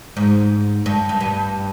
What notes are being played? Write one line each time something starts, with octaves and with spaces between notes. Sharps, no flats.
G#2
G2
G2
G2